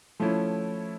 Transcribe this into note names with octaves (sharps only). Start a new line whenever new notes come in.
F3 A3 C#4 E4